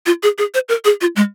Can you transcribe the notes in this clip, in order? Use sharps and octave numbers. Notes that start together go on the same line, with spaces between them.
F4
G#4
G#4
C5
A#4
G#4
F4
G#3